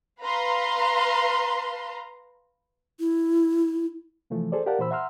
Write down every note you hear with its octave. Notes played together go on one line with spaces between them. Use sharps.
B4 F5 A#5 C6
E4
C3 E3 F3 A3
G#4 A4 C5 D5
G4 A#4 D5 F5 F#5 A5
A#2 E3 C5 B5 E6
E5 F#5 A#5 C6 E6 F6